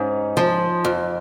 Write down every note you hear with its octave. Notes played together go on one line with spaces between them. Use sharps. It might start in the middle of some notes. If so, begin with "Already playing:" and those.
Already playing: G#2 C#4 D#4
F3
F2